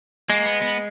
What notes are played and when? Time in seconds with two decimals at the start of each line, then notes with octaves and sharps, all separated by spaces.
0.30 G#3 A#3
0.45 B3
0.62 B3